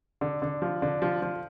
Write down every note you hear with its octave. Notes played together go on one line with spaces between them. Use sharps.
D3
D3
F3
D3
F3
F3